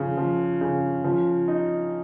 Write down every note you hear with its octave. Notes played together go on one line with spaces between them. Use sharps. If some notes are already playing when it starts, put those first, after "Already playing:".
Already playing: C#3 F3
F3
C#3
F3
D#4